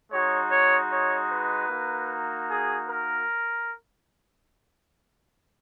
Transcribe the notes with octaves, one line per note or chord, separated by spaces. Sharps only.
G#3 D#4 F#4 C#5
C#5
C#5
B4
A#3 D#4 F#4
G#4
A#4